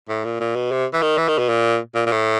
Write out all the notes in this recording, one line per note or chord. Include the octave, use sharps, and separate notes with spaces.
A2
A#2
A#2
B2
C3
E3
D#3
E3
D#3
B2
A#2
A#2
A#2
A2